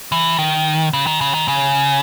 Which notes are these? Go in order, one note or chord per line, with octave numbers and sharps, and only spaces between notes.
E3
D#3
C#3
D#3
C#3
D#3
C#3